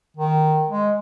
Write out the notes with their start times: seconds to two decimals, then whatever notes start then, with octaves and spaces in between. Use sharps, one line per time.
0.17 D#3
0.69 G#3